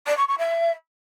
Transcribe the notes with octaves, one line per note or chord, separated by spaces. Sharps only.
D5
C#6
C#6
E5